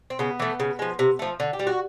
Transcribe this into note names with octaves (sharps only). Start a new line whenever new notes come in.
C4
C#3 B3
E3 A3
C#3
F3 G#3
C3
F3 A3
D3
G4
G3
F#4